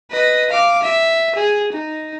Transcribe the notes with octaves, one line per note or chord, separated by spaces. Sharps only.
B4 D#5
F5 D6
E5
G#4
D#4